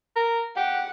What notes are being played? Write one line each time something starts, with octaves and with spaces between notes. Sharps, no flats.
A#4
G4 F#5